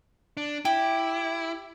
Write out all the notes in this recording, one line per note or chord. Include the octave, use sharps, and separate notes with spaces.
D4
E4 G4